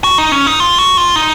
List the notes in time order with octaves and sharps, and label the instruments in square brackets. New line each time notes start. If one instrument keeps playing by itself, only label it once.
[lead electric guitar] F#4
D#4
C#4
D#4
F4
F#4
F4
D#4